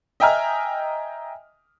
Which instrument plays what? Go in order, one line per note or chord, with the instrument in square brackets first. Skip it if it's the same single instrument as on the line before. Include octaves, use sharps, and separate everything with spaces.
[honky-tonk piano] D#5 E5 G5 G#5 A#5 F6